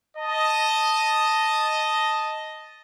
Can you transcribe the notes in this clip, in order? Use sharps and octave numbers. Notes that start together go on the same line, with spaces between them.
D#5 A5